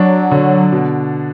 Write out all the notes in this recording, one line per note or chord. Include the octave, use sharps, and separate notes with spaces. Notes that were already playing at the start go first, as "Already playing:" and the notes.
Already playing: F#3 D4
D3
B2